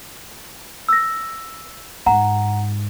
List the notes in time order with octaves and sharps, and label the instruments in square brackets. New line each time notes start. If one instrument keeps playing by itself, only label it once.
[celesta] E6 A#6
[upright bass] G#2 [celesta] F#5 A#5